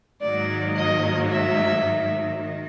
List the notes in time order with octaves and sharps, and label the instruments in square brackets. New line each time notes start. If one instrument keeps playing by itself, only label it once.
[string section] G#2 D#3 F#3 A#3 [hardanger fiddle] D5
[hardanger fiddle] D#5
E5
[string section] D#3